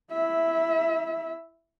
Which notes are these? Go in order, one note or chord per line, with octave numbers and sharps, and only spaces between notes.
E4 E5